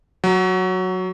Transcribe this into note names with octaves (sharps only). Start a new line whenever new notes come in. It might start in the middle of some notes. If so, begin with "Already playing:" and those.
F#3